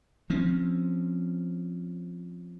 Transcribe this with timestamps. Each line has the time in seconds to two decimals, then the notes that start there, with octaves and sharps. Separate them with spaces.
0.30 F3 C4 C#4